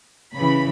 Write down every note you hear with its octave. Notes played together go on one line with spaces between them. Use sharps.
C#3 E3 B5